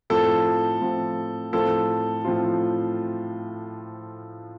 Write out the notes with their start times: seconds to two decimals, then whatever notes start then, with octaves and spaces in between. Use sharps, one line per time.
0.10 A2 F3 C4 F4 A4
0.81 A2 F3 C4 F4
1.53 A2 F3 C4 F4 A4
2.24 A2 F3 C4 F4